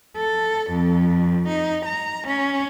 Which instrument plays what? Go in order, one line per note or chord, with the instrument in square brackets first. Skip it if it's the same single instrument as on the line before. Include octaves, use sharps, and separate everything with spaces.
[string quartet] A4
F2
D#4
A#5
C#4